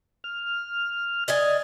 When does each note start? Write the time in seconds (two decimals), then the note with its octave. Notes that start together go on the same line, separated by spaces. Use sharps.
0.24 F6
1.28 D5 D#5 G#5